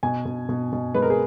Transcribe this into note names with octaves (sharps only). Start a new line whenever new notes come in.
B2 G#5
B2
B2
B2
G#3 B4
A#4
G#4